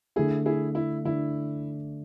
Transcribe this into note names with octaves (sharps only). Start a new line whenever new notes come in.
D3 A3 D4 E4 G#4
E4 G#4
E4
D3 A3 D4 E4